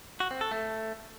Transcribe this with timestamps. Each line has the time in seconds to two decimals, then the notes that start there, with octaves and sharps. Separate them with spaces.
0.20 F#4
0.31 C4
0.41 A4
0.51 A3